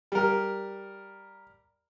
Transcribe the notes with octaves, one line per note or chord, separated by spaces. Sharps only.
G3 A#4